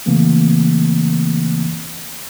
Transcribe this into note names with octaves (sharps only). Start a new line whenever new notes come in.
C#3 E3 A3 A#3 C4